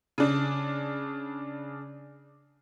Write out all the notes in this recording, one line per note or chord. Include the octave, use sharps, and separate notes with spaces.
C#3 D4